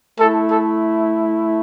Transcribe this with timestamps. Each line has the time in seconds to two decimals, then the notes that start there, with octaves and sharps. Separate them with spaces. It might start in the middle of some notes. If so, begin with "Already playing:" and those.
0.19 A3 E4 A4
0.50 A4